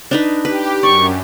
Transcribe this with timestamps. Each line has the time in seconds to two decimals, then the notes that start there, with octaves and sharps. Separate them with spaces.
0.11 D4 D#4 B4
0.45 G4 B4
0.83 F#2 D5 C#6